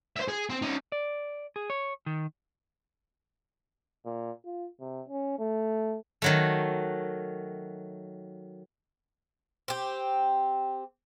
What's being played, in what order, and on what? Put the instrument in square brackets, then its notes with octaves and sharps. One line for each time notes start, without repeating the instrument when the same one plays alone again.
[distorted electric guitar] C5 E5
G#4
C4
C#4 D#4
[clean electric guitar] D5
G#4
C#5
D#3
[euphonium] A#2
F4
C3
C#4
A3
[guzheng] D#3 F#3 A3
[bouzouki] C4 G4